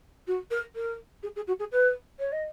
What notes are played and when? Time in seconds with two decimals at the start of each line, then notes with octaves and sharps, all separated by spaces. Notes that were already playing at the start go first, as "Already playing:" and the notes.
0.27 F#4
0.50 A#4
0.75 A#4
1.23 G#4
1.36 G#4
1.47 F#4
1.59 G#4
1.72 B4
2.19 C#5
2.32 D#5